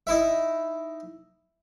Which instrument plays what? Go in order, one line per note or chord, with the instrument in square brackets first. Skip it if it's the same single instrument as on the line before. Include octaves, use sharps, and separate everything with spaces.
[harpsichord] D#4 E4 E5